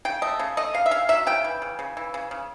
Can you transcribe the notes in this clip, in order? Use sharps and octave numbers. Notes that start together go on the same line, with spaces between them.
C#3 G5
A3 D#5
C#3
A3 D#5
C#3 F5
E5
C#3 F5
F#3 E5
C#3 G5
E3
C#3
C#3
E3
C#3
C#3